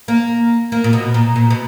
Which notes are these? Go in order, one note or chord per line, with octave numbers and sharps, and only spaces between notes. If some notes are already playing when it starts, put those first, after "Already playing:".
A#3
A#3
A#2
B2
A#2
A#2
B2